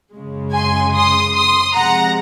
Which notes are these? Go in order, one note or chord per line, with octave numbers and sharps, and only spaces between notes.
F#2 C#3 G#3
G#5 C6
C6 D#6
C6 D#6
C3 F3 G#3 F#5 A#5